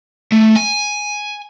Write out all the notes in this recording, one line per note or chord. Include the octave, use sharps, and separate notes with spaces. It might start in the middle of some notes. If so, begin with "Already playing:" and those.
A3
G#5